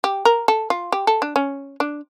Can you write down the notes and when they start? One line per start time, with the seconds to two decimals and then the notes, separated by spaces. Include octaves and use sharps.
0.04 G4
0.25 A#4
0.48 A4
0.70 F4
0.92 G4
1.07 A4
1.22 D4
1.36 C#4
1.80 D4